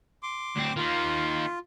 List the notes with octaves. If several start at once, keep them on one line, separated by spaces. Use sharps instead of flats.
C6 D6
D2 C4
D#3 A#3 F4